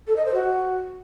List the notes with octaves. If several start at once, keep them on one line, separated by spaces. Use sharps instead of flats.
A4
D#5
C5
F#4